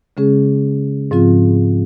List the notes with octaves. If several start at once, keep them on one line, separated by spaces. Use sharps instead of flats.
C#3 G#3 C#4 G#4
G#2 F3 C4 F4